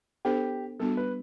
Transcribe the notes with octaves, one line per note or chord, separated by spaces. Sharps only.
B3 D4 G4 A4 C5
G3 B3 D4 F#4 A4
B4